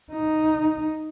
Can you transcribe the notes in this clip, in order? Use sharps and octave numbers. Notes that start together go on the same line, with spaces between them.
D#4